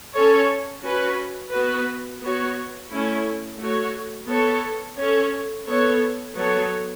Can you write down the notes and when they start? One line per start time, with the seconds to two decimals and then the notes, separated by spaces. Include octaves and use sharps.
0.14 C#4 A4 C#5
0.83 C#4 F#4 B4
1.52 B3 F#4 B4
2.21 B3 F#4 C#5
2.91 A3 C#4 E4
3.59 A3 F#4 C#5
4.28 B3 A4 C#5
4.97 C#4 A4 C#5
5.67 B3 A4 C#5
6.35 F#3 B3 A4 C#5